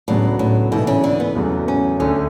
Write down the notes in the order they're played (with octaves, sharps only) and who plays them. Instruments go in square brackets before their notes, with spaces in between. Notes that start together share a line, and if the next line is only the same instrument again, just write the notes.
[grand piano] C#2 C#3 F#3 B3 D4 [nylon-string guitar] A2
[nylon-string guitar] A2
[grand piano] G#2 E3 A3 [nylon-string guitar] B2
[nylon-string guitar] C#3
D3
B3
[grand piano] E2 C#3 F#3 A3
[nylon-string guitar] C#4
[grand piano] D2 D3 A3 [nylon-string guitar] C#4